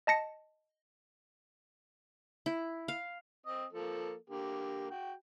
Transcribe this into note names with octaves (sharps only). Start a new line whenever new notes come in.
D#5 A5 A#6 C#7
E4
F5
C4 D#5
F3 A#3 A4
D3 A#3 G4
F#4 G5